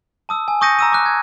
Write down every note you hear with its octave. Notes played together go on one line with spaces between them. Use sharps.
A5 D#6 E6
G#5
C#6 D#6 G6 A#6 C#7 D#7
A#5 E6 D#7
D6 D#6 F#6
G#6